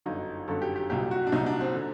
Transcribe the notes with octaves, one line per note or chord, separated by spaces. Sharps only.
G1 F#2 D3 D#4
G1 F#2 D3 A4
G4
G4
C2 A#2 F#3 G4
F#4
D4
C2 A#2 F#3 D#4
D4
C4
D3